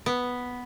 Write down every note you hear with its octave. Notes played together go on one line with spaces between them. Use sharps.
B3